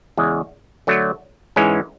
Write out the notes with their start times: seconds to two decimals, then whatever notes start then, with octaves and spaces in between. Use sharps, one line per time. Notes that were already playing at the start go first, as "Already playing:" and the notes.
0.17 E2 C#3 G#3
0.87 D3 F#3 A3
1.56 G#2 E3 G#3 C#4